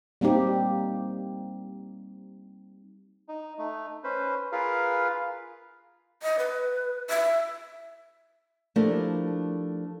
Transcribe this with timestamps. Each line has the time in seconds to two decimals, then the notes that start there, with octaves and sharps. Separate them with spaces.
0.21 G3 A#3 C4 D#4 G4
3.29 D#4
3.58 A3 D#4
4.04 C#4 B4 C5
4.52 F4 G#4 A#4 B4 F5
6.23 D#5
6.39 B4
7.10 E5
8.76 F3 A3 D4 E4 G4 A#4